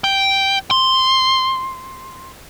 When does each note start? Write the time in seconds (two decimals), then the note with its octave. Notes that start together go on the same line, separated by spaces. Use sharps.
0.04 G5
0.71 C6